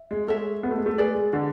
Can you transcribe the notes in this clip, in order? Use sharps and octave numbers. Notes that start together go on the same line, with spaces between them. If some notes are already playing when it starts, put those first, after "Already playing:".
Already playing: E5
G#3
G#3 A4 C#5 E5
B3
A3
G#3
A3
G#3 G#4 B4 D5
G#3
D3